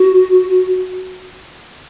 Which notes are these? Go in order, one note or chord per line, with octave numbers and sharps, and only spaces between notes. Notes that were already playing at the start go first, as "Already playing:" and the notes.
Already playing: F#4